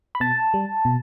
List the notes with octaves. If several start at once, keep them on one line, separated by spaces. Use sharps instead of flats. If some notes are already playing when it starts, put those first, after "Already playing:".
B5
B2 A5
G3
B2